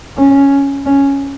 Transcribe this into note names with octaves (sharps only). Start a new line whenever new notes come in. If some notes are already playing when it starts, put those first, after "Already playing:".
C#4
C#4